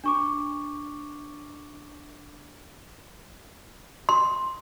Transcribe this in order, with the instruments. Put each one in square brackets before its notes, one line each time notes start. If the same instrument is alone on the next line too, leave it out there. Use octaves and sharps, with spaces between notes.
[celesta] D4 C#6 D6
[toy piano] C6